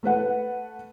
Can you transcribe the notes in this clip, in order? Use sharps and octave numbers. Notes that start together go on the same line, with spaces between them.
A3 A4 B4 F#5